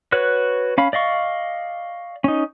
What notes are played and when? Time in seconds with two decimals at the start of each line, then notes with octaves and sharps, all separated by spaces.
0.12 F#4 B4 C#5 F#6
0.78 C#4 F5 B5
0.93 D5 D#5 F5 C#6
2.24 C#4 D#4